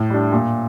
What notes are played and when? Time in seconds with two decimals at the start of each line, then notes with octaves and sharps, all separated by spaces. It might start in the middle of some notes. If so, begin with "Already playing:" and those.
Already playing: A2
0.10 G3 D4
0.32 A#2